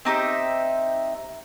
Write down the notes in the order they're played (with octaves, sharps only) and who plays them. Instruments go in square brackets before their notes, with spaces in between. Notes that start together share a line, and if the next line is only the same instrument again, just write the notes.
[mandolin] C4 D#4 G4 E5